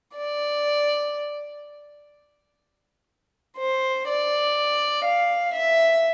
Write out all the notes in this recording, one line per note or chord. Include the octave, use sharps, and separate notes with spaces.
D5
C5
D5
F5
E5